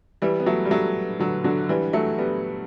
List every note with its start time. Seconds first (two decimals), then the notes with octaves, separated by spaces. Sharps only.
0.22 E3 G3
0.40 B3
0.46 F#3 A3
0.65 G3
0.70 F#3 A3
1.19 D3 F#3
1.44 D3 F#3
1.69 E3 G3
1.93 F#3 A3
2.18 G3 B3